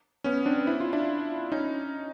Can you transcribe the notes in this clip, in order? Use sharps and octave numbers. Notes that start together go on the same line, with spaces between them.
B3 C#4
C4 D4
E4
F4
D4 E4
C#4 D#4